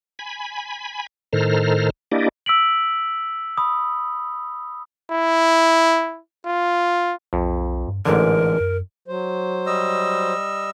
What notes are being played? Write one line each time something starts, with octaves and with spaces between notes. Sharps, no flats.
G#5 B5
A2 D#3 A4 C5 A#5 F6
A#3 D4 E4 G4 D5 D#5
E6 B6 D7 F#7
B5 D#6
E4
F4
B1 F2
G2
A1 G#2 D3 E3 A#4
F#2
F#3 C5
G3 D#5 E6